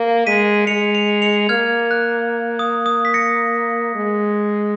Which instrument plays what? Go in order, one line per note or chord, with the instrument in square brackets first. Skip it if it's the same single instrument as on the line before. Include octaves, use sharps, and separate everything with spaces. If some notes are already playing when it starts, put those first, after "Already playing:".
Already playing: [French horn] A#3
[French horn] G#3 [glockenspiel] B6 D#7
[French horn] G#3 [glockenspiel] C#7 F7
[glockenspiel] C#7 F7
C#7 F7
[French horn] A#3 [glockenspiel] F6 G#6
[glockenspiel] F#6
D#6
D#6
B6
A#6 C#7
[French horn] G#3